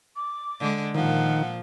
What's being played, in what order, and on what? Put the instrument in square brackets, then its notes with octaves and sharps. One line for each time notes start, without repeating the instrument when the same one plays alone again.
[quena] D6
[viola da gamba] D3 G#3
[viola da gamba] A#2 F3 [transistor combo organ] D#3 [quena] F#5